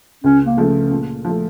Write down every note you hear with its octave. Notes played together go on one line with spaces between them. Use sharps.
C#2 C#4
A#3
C#3 F3 A3
A#2
F3 A3